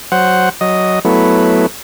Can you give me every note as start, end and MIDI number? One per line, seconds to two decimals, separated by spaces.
0.12 0.49 54
0.12 0.49 72
0.12 0.49 78
0.61 0.99 54
0.61 0.99 75
1.05 1.66 54
1.05 1.66 57
1.05 1.66 59
1.05 1.66 64